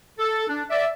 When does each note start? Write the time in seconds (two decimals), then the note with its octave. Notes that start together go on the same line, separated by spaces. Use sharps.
0.19 A4
0.48 D4
0.70 D5 E5